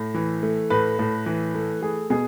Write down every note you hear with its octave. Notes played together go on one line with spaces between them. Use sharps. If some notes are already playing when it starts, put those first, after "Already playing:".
Already playing: A2
E3
A3
A2 B4
A2
E3
A3
A3 G#4
B2 G#4